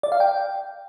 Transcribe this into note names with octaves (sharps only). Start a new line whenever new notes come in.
D5
F5
G5